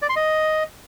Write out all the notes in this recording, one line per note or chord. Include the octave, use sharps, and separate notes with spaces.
D5
C6
D#5